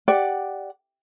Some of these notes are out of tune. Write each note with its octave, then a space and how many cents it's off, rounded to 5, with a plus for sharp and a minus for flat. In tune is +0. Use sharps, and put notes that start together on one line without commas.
G4 +0 D5 +0 F#5 +5